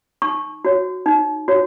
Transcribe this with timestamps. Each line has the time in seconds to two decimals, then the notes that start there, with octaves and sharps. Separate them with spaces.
0.22 D#4 C#6
0.65 F#4 C#5
1.06 D#4
1.48 F#4 C#5